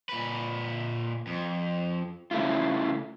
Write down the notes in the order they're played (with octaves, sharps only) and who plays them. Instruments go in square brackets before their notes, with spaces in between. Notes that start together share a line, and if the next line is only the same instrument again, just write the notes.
[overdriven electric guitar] A#2 B4
F2
[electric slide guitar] C#3 A3 E4 F4